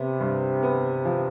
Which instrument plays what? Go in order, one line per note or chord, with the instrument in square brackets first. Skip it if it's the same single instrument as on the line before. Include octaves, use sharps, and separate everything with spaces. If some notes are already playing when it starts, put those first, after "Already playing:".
Already playing: [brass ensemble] C3 [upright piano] B3
[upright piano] G2
B3
F3